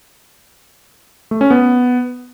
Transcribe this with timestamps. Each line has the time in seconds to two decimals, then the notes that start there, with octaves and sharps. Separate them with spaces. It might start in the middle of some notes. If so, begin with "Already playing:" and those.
1.31 A3
1.41 C#4
1.51 B3